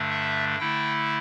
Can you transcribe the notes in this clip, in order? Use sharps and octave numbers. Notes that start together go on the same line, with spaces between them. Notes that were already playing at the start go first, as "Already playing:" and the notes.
Already playing: G2 D3 A3 D4
E5
D3 A3 E4 G5